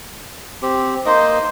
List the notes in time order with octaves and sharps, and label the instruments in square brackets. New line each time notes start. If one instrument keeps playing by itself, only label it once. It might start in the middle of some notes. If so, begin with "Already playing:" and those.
[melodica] C4 G4
[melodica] A#3 D#4 D#5 [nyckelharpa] C5